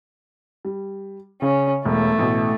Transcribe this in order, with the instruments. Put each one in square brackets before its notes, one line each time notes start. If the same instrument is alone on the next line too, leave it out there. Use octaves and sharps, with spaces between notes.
[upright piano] G3
[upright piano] C#3 [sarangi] C#4
[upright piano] E1 [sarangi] A3
[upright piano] A1 B2